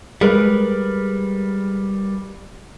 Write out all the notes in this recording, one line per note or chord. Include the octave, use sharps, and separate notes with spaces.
G3 G#3 A#4 B4